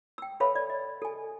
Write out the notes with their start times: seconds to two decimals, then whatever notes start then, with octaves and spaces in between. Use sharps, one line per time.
0.18 G5 E6
0.40 A4 B4 C#5 E5 F5 B5
0.55 D5
0.70 D#5
1.02 A4 G#5